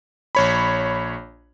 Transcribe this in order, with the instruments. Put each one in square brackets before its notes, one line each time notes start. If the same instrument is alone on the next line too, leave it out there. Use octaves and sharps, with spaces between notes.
[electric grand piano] A#1 C#5 B5